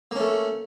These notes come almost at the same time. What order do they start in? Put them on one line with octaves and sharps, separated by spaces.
A#3 C#4 A3